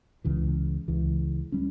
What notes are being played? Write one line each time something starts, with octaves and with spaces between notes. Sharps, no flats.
C#2 C#3 E3
C#2 C#3 E3
G3 C#4